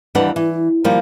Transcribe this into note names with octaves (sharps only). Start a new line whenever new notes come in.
D#2 E3 G3 B3 D4 F#5
E3
D#3 F3 G3 A#3